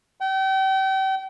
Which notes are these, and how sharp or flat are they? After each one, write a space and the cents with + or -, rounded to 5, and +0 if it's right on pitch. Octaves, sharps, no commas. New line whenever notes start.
G5 -35